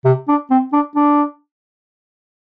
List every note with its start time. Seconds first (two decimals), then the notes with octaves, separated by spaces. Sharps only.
0.05 C3
0.28 D4
0.51 C4
0.73 D4
0.96 D4